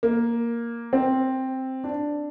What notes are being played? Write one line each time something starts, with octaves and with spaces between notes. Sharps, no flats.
A#3
C4
D4